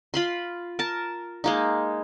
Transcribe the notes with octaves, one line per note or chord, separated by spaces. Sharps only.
F4 B5 C6
A#4 A5
G#3 A#3 D#4